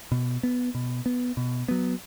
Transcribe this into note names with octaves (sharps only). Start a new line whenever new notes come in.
B2
B3
B2
B3
B2
F#3 B3